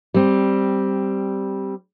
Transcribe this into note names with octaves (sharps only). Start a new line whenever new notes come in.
G3 C4